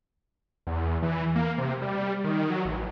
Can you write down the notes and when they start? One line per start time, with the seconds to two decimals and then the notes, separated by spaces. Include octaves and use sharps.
0.67 E2
1.03 E3
1.36 A#3
1.58 C3
1.82 G3
2.24 D#3
2.50 F#3
2.65 A1